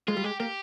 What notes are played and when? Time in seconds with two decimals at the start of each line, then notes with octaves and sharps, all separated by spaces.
0.08 G#3 F4
0.17 G3
0.24 G#3 G4
0.40 A#3 G4